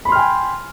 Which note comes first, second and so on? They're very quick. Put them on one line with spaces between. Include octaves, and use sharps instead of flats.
B5 C6 F6 G5 G#5